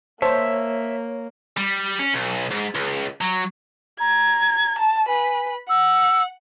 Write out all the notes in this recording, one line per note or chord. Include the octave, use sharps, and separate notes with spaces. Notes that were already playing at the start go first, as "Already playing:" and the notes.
A#3 C5 C#5 E5 A5
G3
C#4
B1
G#2
C#2
F#3
A#5 G#6
A5
B4 G#5
F#5 E6